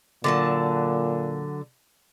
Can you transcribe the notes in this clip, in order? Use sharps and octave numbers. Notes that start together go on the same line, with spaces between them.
A#2 D3 F#3 A5